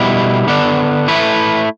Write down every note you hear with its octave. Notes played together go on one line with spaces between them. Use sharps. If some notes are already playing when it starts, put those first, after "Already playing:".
Already playing: B2 G3 E4
D3 B3 D4
A3 E4 B4